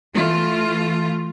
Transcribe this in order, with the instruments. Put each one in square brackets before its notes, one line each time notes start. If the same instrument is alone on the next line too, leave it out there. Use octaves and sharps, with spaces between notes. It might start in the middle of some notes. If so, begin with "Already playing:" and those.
[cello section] E3 A3 F4